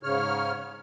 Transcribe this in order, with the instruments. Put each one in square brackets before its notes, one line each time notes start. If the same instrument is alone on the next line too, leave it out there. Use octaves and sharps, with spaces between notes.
[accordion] G#2 C#3 C#5 F6